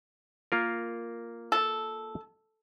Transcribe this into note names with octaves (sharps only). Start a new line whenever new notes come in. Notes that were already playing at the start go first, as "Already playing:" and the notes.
A#3 F4 A#4
A4